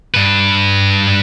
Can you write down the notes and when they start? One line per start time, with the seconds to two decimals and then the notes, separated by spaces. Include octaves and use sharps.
0.14 G2 B4